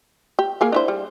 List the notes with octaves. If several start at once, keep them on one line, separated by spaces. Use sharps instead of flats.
G4
A#3 G#4 A#4
D4 E4 C5
G3